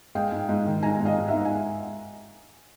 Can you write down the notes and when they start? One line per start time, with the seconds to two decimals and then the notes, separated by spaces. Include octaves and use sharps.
0.15 G#3 F5 G5
0.32 G#2
0.49 G#2
0.66 D#3
0.83 G#2 G#5 A#5
1.00 G#2
1.05 D#5 F5
1.17 G#2
1.28 E5 F#5
1.34 G#2
1.45 G#5